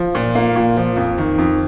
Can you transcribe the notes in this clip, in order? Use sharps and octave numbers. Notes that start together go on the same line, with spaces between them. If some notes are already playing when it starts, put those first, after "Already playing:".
Already playing: F3
A#2
A#3
A#2
F3
F2
D#3
F2